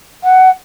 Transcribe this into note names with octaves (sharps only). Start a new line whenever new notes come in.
F#5